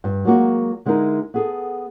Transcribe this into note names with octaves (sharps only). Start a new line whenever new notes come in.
G2
F#3 G#3 A#3 F#4
D3 G#3 D#4 E4 A#4
B3 G#4 A4